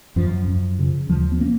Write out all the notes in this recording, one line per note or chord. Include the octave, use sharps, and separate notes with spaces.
F#2 F3
F#2
C#3
D#2 F3
B3
A#3 C#4